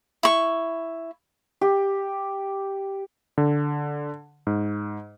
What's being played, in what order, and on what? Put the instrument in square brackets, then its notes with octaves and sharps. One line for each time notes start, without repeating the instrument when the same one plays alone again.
[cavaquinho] E4 C#6
[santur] G4
[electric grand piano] D3
G#2